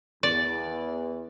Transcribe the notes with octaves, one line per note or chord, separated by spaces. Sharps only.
E2 D5